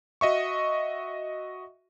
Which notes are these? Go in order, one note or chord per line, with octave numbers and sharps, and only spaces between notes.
F#4 D#5 E5 C#6